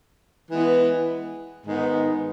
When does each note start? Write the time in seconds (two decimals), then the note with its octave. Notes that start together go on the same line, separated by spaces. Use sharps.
0.50 E3 G#3 B3
1.65 G#2 D#3 G#3 B3